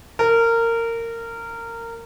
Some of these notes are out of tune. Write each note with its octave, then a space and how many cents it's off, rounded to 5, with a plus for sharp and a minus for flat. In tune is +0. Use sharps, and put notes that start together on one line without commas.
A#4 -20